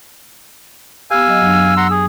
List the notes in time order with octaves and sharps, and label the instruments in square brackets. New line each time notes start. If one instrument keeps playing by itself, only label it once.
[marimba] B3 G4 [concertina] F5 G#5 [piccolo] E6
[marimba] F#3 D#5
F#2 F#3 D4
[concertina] F#5 A#5 C6
G#4